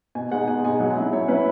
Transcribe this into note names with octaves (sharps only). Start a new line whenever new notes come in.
B2 G#5
G#3 D#4 F#5
B2 G#5
G#3 D#4 G#5
F#3 F#5
G#5
C#4 E4
F#3 C#5
C#4 E4 B4